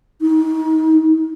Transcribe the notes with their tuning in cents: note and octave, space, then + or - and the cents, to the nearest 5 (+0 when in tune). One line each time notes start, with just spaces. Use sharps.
D#4 +30